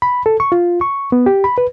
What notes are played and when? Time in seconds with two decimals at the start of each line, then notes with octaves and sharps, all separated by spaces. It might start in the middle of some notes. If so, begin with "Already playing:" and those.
0.02 B5
0.26 A4
0.40 C#6
0.52 F4
0.81 C#6
1.12 B3
1.26 G4
1.44 B5
1.58 B4